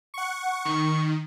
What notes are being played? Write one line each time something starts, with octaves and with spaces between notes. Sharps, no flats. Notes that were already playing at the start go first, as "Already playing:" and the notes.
F#5 C#6
D#3 C#6